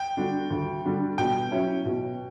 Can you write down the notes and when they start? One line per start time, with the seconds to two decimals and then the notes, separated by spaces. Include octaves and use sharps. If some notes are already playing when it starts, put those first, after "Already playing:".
Already playing: G5
0.17 D3 G3 D4 F#4
0.50 D2
0.84 D3 G3 D4 F#4
1.18 B2 G5
1.51 F#3 C#4 E4
1.85 B2